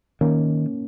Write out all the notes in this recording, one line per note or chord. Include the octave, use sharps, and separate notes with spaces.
D#3 A#3 C#4